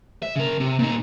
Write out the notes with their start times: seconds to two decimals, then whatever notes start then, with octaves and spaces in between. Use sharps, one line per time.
0.22 E5
0.36 C#3 A#4
0.60 C3
0.79 A#2 D#4